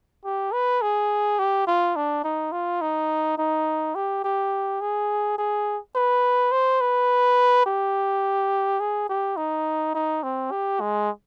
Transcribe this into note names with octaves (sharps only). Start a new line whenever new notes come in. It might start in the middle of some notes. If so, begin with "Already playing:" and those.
G4
B4
G#4
G4
F4
D4
D#4
F4
D#4
D#4
G4
G4
G#4
G#4
B4
C5
B4
G4
G#4
G4
D#4
D#4
C4
G4
G#3